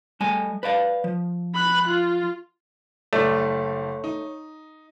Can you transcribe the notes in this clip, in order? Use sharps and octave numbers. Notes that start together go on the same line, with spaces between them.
G3 A3 G#5
B4 D5 F5
F3
B5 F#6
F4
F#1 G3 A3 C#5 D5 C#6
D#4